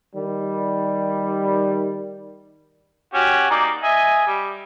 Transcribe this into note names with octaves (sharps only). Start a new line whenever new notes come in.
D#3 G3
C#4 F#4 G4
A#3 D#4 D5
D#5 E5 G#5
G3